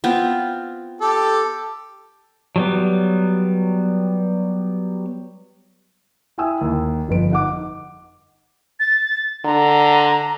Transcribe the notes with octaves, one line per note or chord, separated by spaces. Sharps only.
B3 C4 F4
G4 A4
F#3 G3 B3
E4 E5 G5 G#5 D#6 E6
D#2
G1 F2 B4 D7
D#4 F#5 D6
A6
D3 A#5